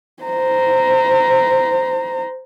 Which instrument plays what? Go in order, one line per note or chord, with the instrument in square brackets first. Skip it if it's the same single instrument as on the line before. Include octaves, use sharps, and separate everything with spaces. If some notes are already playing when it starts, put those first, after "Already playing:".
[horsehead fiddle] C5 A#5